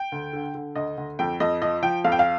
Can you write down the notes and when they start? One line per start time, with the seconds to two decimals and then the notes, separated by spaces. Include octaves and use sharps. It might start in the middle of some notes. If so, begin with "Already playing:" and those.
Already playing: G5
0.12 D2
0.33 D3
0.55 D3
0.76 D2 D#5
0.97 D2
1.19 F2 G5
1.40 F2 D#5
1.62 F3 D#5
1.83 F3 G5
2.04 F2 F5
2.12 G5
2.19 F5